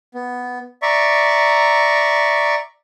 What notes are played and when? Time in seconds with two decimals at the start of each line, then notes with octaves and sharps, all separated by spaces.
0.14 B3
0.82 D5 E5 A#5 C#6